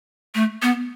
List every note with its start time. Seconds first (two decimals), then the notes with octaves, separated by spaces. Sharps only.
0.35 A3
0.62 B3